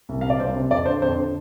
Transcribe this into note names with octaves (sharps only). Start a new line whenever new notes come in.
C2
C3 F5
D5
C2 C5
C3
F2 D5
D3 C5
F2 C5
D3